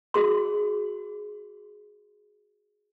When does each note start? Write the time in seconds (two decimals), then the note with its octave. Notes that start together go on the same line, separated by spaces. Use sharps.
0.14 F#4 G#4 C6